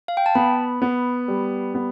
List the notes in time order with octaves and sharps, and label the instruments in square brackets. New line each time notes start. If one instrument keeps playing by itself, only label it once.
[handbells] F5
G5
A5
[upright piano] B3 [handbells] B5
[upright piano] B3
G3
B3